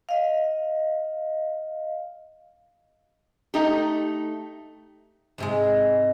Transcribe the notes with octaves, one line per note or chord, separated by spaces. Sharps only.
D#5 F5
A3 D#4 G4
G#2 C3 G#3